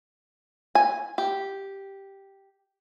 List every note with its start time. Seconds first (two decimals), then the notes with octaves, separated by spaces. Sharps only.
0.75 G#5
1.18 G4